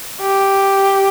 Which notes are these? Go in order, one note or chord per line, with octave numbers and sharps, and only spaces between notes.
G4